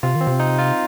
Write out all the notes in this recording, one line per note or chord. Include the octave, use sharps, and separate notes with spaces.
C3 F4
D#3
C4
C3
D#4
F4